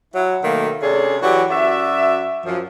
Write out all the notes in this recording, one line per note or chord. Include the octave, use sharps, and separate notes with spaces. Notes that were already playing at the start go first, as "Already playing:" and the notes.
F#3 E4
B2 D#3 F#3 A3 A#3
C3 C#4 D4 G#4 A4
E3 F#3 F#4 G4 D5
F#2 F#4 D5 E5
F#2 F3